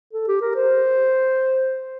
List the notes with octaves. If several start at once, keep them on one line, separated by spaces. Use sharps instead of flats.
A4
G4
A#4
C5